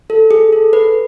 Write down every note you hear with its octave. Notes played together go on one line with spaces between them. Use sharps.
A4
G#4
A4
B4